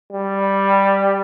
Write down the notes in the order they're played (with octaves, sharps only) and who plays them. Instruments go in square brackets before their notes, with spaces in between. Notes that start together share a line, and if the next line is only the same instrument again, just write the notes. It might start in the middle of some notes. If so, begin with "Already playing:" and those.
[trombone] G3